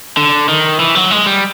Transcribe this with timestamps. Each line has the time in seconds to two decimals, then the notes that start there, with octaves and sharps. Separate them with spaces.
0.17 D3
0.48 D#3
0.80 E3
0.95 F#3
1.11 G#3
1.26 G3